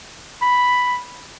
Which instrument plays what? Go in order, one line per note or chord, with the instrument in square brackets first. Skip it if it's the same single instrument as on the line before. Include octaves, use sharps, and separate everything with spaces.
[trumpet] B5